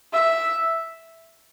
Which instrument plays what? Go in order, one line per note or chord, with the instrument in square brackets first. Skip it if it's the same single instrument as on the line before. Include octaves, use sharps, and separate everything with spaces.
[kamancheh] E5